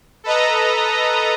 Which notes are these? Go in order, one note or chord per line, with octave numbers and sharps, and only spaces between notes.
A4 B4 D#5 A#5